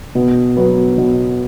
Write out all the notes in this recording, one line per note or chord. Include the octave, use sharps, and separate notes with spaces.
B2
F#3 B3
B2